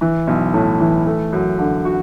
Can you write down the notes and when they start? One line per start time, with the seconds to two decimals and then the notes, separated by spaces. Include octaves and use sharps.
0.01 E3
0.27 B1
0.54 A2
0.80 E3
1.06 A3
1.33 F#2
1.59 D3
1.85 F#4